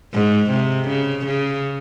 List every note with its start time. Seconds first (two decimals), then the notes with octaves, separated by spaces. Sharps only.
0.14 G#2
0.51 C3
0.89 C#3
1.26 C#3